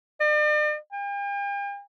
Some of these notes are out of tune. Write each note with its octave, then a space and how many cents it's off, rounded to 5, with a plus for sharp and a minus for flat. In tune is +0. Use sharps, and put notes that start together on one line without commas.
D5 +45
G5 +45